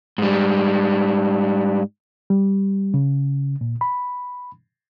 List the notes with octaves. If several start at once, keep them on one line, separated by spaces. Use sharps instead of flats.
G#2 G3
G3
C#3
A#2
B5